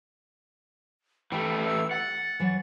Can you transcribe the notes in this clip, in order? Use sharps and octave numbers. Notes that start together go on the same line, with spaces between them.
E3 G3 A3 G5 B5
E6
F#5 A6
E3 F#3